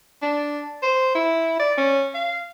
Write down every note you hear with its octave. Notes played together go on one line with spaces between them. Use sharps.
D4
C5
E4
D5
C#4
F5